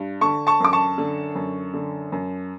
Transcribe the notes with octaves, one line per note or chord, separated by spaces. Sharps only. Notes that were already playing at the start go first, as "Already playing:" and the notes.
Already playing: G2
D3 A5 C#6
A5 C#6
F#2 D6
A5 C#6
D3
F#2
D3
F#2